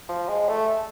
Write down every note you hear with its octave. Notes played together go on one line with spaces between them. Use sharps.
F3
G#3
A3